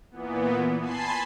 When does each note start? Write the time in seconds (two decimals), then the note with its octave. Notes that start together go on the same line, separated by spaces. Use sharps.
0.11 A#2 E3 B3
0.79 G#5 A5 B5 C6 C7